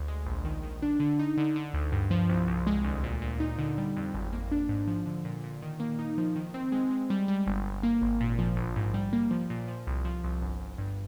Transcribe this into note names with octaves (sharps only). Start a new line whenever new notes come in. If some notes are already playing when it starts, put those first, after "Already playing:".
Already playing: D2
G#3
A#1
D#3
D#3
D4
D3
D#4
D3
D3
D2
G2
F3
C2
C2
G#3
D2
A#2
A#2
D#4
D3
G3
F2
G#1
A#3
D4
G#2
F3
D3
A#2
A#2
D#3
A#3
D#4
F3
D#3
C4
G#3
G#3
G3
G3
G1
G1
A#3
G#1
A#2
F3
A#1
G#2
G3
A#3
F3
A#2
F3
C2
F3
C2
G1
G1
G2